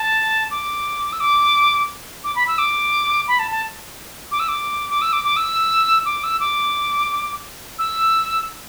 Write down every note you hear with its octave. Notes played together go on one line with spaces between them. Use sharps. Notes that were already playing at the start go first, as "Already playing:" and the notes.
Already playing: A5
D6
E6
D6
D6
B5
E6
D6
B5
A5
A5
D6
E6
D6
D6
E6
D6
D6
E6
D6
E6
D6
E6